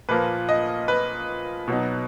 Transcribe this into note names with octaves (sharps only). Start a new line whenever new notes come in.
A#2 F3 A#3 B4
D#5
B4
B2 F#3 B3 D#4